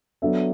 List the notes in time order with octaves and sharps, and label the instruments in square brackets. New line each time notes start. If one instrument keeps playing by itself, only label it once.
[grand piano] F#3 B3 D4 A4 E5